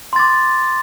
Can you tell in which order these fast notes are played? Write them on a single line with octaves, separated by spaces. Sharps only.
C6 A6 D6